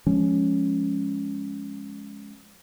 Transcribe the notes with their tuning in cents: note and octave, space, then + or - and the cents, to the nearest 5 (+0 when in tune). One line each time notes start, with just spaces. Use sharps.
F3 +0 G#3 +0 C#4 +0